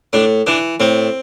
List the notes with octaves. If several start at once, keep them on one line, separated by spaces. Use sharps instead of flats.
A2 D4
E3 D4
A2 C4